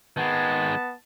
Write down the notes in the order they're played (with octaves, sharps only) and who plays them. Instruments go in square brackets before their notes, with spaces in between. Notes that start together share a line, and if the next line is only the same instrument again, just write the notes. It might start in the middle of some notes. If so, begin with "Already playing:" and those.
[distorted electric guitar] D#3 G#3 [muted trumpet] B3 [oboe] A5